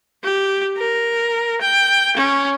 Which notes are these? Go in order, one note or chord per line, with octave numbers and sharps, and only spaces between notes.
G4
A#4
G5
C#4